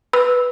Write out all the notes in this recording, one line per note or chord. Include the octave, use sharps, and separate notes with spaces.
B4 B5 E6